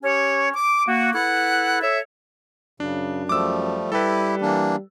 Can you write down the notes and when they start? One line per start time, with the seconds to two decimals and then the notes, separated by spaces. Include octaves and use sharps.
0.03 C#4 G4 C#5
0.54 D6
0.87 A#3 F#4
1.14 E4 A4 B4 F#5
1.82 A4 C#5 E5
2.80 F#2 C#3 D4
3.29 F3 G3 A3 D6 E6
3.92 G3 E4 G4 A4 B4
4.41 E3 A#3 D4